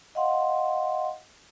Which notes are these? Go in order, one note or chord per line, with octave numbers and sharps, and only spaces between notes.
D#5 F5 F#5 C6